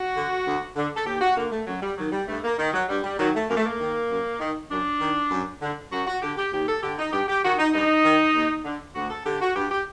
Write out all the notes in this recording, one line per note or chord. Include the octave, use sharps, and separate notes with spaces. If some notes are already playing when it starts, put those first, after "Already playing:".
Already playing: F#4
D3
D2
D3
A4
D#2 G4
F#4
D3 A#3
A3
F#2 F#3
G3
D#3 F#3
G3
G2 A3
A#3
D#3
F#3
G2 G3
G3
D#3 F#3
A3
F#2 A#3
A3
A#3
D#3
F#2
D#3
F#2 D4
D#3
F#2
D3
F#2 F#4
F#4
D3 G4
G4
D#2 G4
A4
D3 G4
D#4
G2 G4
G4
D#3 F#4
D#4
G2 D#4
D#3
D#2
D3
D2 F#4
A4
D3 G4
F#4
G2 G4
G4